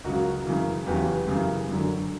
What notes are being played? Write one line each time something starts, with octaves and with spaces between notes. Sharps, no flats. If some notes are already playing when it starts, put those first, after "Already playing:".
C#2 C#3 F#3 F#4 A#4
F#2 C#3 E3
E2 C#3 F#3 G4 B4
F#2 C#3 E3
F#2 D3 F#3